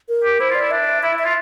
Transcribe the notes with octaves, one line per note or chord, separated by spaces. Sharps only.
A#4
G4
E4 C5
F4 D5
E4
D4 E5
E4 E5
E4
E5
F4